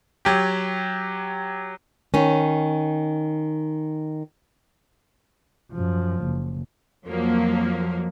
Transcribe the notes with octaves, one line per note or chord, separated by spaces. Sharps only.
F#3 G4
D#3 C#4
F#2 F3
F#1
F2 F3 F#3 A#3